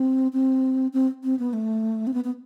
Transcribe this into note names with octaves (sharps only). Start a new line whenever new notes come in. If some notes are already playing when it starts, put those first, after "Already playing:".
Already playing: C4
C4
C4
C4
B3
A3
C4
B3
B3